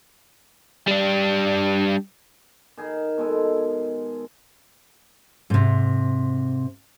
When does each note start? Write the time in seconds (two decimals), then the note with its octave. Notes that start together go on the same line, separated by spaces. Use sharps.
0.88 G3 D4
2.77 D#3 G#4
3.18 B2 G#3 A4
5.50 G#2 C3